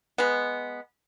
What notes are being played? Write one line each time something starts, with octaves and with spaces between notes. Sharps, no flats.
G#3 B3